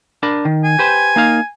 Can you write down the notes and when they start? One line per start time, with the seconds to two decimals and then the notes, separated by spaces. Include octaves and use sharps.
0.23 D4 A#4 B5
0.45 D#3
0.64 G#5
0.79 G4 B4 C5
1.16 A#3 D#4 F5